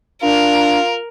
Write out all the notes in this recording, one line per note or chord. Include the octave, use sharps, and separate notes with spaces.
D4 F4 A#4